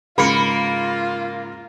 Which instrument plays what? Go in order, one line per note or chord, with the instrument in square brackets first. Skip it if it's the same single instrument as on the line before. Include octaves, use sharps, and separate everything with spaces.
[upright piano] G#2 C#3 [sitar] A#3 [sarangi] F4 [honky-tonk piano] B5 C#7